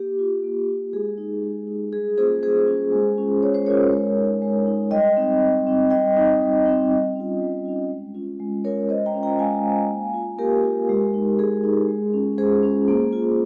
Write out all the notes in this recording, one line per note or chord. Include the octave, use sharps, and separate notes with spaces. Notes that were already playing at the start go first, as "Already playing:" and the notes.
Already playing: A#3 G4
F4
A#3
F4
G#3 G#4
D#4
G#3
D#4
G3 G#4
A#3 C#4 F4 G#4 C5
G3 G#4 C5
A#3 C#4 F4
G#3
C#4 F4
G#3 C#5
C5
C#4 F4 A#4 C#5
G#3
D#4
G#3
D#4
G3 D#5 G5
C4 D#4
G3
C4 D#4
G3 D#5 G5
C4 D#4
G3
C4 D#4
G3
C#4 F4
G3
C#4 F4
G#3
C#4 F4
G#3
C#4 F4 A#4 C#5
G#3 C5 D#5
G5 A#5
C#4 F4
G5 A#5
G#3 F5 G#5
C#4 F4
A#3
F4
A#3 G4 A#4
F4
G#3
D#4
G#3 G#4
D#4
G#3
C#4 F4
G#3 G#4 C5
C#4 F4
A#3
F4